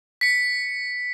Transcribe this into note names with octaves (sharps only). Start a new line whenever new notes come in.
B6 C#7